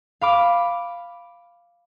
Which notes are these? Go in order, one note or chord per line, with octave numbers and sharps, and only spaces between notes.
F5 B5 D6